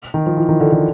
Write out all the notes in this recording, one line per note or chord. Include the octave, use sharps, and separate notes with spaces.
D#3
F3
E3
D#3
D3
D3